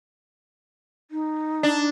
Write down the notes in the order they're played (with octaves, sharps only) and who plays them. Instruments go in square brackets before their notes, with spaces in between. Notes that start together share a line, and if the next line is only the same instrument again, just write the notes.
[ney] D#4
[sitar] D4